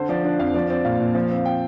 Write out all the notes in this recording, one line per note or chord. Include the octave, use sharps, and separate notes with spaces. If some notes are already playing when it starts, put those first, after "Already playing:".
Already playing: D3 C5
F3 D5
D4 D5
F2 F5
F3 D5
C4 D5
A#2 F5
A#2
F3
C4
G5